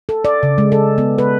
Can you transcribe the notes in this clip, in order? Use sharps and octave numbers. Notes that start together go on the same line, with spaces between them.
A4
D5
C#3
G#3
A4
B3
B4